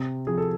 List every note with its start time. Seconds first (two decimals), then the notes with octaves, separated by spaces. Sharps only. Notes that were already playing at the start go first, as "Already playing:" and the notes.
Already playing: C3
0.27 F3 G#4
0.38 A4